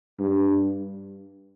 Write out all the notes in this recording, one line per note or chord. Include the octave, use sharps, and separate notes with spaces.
G2